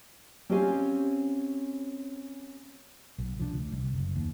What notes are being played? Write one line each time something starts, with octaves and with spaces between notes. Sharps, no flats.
C4 C#4 G4 C5 F5 G#5
B1
C2 F3 F#3 D4
D2
C2
F#1
D#2